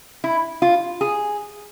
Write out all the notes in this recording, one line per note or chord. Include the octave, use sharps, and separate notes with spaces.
E4
F4
G#4